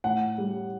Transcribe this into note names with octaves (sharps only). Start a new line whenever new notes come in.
A2 F#5
G3